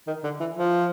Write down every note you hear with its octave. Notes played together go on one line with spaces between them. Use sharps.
D#3
D3
E3
F3